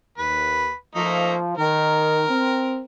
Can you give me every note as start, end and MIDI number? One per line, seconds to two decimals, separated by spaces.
0.18 0.71 39
0.18 0.73 71
0.95 1.54 53
0.95 1.35 57
0.95 1.35 58
0.95 1.35 63
1.57 2.25 51
1.57 2.85 70
2.29 2.81 60